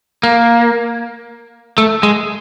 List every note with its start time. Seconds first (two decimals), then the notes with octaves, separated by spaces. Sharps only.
0.23 A#3
1.78 A3
2.03 G#3